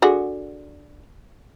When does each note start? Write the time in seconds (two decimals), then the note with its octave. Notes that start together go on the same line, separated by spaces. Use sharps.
0.02 D3 F#4 G#4